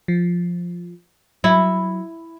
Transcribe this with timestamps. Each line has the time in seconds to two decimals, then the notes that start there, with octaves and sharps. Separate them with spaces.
0.08 F3
1.44 F#3 E4